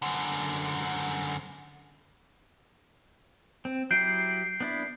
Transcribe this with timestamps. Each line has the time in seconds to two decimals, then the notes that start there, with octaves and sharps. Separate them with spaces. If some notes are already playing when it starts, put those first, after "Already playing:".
0.02 F#2 D3
3.65 C4
3.91 F#3 E4 G4 G6 C7 D7
4.60 B3 D4 E4